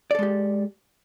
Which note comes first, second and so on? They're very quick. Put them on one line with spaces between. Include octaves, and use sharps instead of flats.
D5 A4 G#3 G4